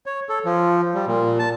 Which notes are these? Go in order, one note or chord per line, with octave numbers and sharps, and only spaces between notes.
C#5
A4
F3
G3
A#2
A5